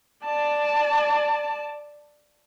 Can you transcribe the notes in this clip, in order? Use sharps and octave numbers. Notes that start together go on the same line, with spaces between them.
D5 A5